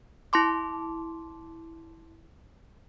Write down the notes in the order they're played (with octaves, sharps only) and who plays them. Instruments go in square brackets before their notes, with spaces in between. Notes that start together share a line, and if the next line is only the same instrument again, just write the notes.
[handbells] E4 A5 C6 D6